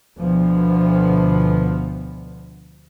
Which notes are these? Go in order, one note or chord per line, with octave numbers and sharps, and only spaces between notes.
D2 B2 D3 F3 B3